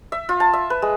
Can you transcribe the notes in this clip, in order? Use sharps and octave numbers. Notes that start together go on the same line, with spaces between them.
E5
F4
A5
E5
B4
G#3